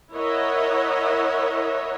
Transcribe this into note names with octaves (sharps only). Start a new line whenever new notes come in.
E4 A#4 C#5 D#5 E5 F#5